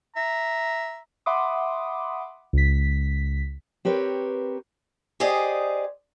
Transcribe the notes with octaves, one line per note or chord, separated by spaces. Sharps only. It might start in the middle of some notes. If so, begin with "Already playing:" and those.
E5 A#5
E5 F#5 B5 C6 D6 D#6
C#2 B6
C4 G4 A#4 B4 C#5
G4 G#4 C5 D5 D#5